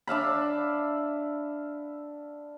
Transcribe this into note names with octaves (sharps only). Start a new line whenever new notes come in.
D4 E5 F5 B5